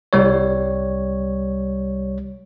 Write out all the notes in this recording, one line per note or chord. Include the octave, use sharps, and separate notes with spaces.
C2 G3 C#5